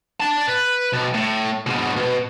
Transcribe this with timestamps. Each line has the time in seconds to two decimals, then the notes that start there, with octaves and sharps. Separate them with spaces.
0.20 D5 A5
0.49 B4
0.93 B1
1.15 A2
1.66 G#2 B2
1.96 B2